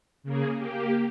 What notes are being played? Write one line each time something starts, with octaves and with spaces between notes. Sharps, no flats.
C#3 A#3 G#4
A#3 G4